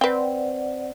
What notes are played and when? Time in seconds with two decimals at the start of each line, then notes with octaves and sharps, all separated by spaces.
0.01 C4 B4 D5 F#5 G5